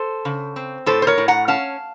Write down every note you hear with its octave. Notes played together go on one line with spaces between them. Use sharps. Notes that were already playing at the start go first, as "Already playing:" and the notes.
Already playing: A4 C5
C#3
C4
A2 A4 C5
C5
A#4 C#5
A2
F#5 A#5
C#4 F5 A5